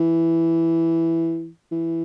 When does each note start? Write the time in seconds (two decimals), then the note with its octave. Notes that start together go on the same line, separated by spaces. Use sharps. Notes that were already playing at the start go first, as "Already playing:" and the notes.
Already playing: E3
1.72 E3